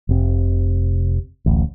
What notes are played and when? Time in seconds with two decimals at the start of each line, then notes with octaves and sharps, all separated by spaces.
0.09 F1 C3
1.46 D1 A1